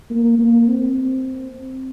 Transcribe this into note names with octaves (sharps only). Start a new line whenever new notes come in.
A#3
A#3
C4